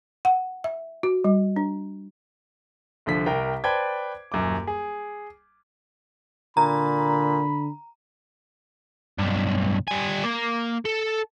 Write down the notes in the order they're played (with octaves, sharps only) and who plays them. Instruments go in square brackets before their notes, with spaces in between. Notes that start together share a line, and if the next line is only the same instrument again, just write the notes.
[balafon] F#5
E5
F#4
G3
D4
[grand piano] C2 D3 F3 B6
C2 A#4 G5
B4 C5 D5 G5 A5 G#6
D#1 F#2 D6
G#4
[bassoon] A#2 [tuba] D3 [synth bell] A#5 [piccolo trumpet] B5
[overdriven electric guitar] B1 G2
G3 G#5
A#3
A4